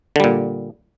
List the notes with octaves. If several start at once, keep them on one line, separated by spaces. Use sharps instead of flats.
A#2 D3 G3